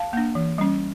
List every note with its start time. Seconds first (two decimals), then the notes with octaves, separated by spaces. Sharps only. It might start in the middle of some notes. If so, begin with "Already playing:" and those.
Already playing: F5 A5
0.13 A#3 D4
0.35 E3
0.58 G3 C#4